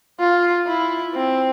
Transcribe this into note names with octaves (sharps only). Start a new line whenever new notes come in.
F4
E4
C4